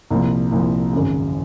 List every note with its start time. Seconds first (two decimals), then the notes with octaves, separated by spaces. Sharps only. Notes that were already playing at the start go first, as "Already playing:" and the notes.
0.10 C2 A#2 F3
0.52 C2 A#2 F3
0.93 G#1 F#2 C#3